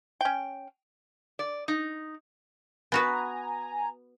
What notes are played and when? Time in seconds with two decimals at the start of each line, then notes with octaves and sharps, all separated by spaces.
0.21 C#4 G5
1.39 D5
1.68 D#4
2.92 B3 F#4 B4 G#5 A#5